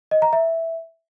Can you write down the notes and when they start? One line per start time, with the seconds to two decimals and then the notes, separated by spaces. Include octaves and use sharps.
0.11 D#5
0.22 A#5
0.33 E5